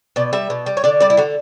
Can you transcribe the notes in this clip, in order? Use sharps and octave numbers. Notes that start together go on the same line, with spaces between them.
B2 D5
G3 E5
B2
G3
C#5
D3 D5
G3 D5
E4
D3 F#4